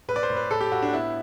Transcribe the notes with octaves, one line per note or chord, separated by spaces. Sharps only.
A2 B4
D5
C5
A2
B4
A2 A4
G4
A2 F#4
D4
B3 E4